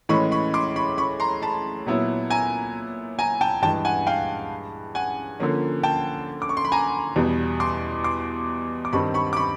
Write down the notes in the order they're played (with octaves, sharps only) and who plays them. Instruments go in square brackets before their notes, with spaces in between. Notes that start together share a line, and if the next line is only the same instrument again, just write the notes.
[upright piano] A2 E3 G#3 C#4 [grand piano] B5 C#6
[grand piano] B5 C#6
C6 D6
B5 C#6
B5 C#6
A#5 C6
A5 B5
[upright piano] A#2 F#3 B3 E4
[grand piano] G#5 A#5
G#5 A#5
G5 A5
[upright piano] G2 E3 G#3 [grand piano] G5 A5
[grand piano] F#5 G#5
F5 G5
F#5 G#5
[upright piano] D3 F3 A#3 C#4
[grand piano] G5 A5
D6
C#6
C6
B5
G#5 A#5
[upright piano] E2 B2 G3
[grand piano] C6 D6
C6 D6
D6
[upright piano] G2 D#3 G3 C4 [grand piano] B5 C#6
[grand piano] B5 C#6
D6
B5 C#6